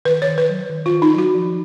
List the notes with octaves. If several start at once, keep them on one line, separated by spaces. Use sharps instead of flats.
D#3 B4
C#5
D#3
B4
F#3
D#3
F4
D#3
D#4
F#3
F#4
F3